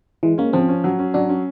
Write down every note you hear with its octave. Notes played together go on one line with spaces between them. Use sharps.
E3 G#3
A#3 C#4
F3 C4
C#4
F#3
C#4
F#3 D4
C#4